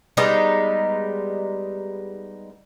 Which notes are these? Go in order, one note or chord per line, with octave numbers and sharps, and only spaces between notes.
G3 G#3 B3 D#4